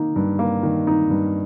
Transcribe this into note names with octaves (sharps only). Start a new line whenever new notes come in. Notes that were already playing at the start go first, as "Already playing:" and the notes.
Already playing: D#3 A#3 D#4
G2
A#3
D#3
D#4
G2